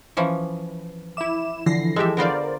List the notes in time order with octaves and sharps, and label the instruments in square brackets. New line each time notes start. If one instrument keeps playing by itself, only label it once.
[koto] E3 F3 C#4
[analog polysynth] E4 E7 [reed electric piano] E5 D6
[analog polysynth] D3 A#6 C7 [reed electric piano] E3 F3 E4
[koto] G#3 E5 [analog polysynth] G4 A4
[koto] D3 B3 F4 [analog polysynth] A#4 C5 D5